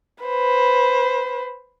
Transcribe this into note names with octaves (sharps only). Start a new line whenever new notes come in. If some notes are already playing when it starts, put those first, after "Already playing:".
B4 C5